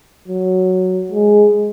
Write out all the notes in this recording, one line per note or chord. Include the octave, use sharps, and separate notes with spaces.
F#3
G#3